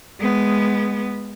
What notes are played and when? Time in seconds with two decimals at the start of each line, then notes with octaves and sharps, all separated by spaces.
0.19 G#3 B3